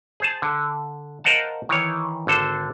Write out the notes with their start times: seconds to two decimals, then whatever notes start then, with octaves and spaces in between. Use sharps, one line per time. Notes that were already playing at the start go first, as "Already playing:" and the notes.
0.20 G#4 C5 A5
0.42 D3
1.24 A#4 C5 D#5 F5 F#5 A5
1.69 D#3 E3 C#5
2.27 G#1 D3 A4 C5